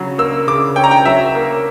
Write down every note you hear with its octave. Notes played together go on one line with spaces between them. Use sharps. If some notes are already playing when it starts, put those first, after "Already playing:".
Already playing: C#3 F#3 C#4
A#3 E6
C#3 D6
C#4 G5
A#5
G5
F#3 E5
A#3